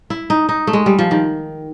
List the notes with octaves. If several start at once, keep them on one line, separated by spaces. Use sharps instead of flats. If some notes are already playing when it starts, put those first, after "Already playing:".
E4
D#4
D#4
A3
G#3
G3
F3
D#3